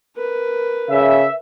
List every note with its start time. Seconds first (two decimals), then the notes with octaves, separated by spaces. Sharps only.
0.17 A#4 B4
0.91 C#3 E5